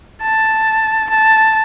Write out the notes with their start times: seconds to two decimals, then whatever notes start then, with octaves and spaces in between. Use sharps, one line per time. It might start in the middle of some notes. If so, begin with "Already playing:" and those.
0.22 A5
1.10 A5